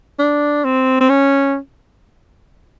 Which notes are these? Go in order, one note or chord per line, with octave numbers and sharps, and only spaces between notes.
D4
C4
C4
C#4